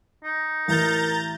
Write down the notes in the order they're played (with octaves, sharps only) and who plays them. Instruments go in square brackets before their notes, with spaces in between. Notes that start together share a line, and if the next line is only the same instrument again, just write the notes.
[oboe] D#4
[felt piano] A1 [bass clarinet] A#4 [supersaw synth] A#5 G6 A6